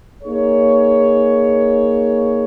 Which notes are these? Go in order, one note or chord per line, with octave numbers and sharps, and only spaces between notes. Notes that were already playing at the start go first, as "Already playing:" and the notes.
A#3 D#4 G#4 C#5